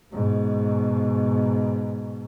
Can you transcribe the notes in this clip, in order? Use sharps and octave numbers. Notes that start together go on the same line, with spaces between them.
G#2 B2